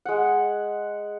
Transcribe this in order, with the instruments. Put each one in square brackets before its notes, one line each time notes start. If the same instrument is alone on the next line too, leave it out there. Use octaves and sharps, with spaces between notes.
[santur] G#3 F#5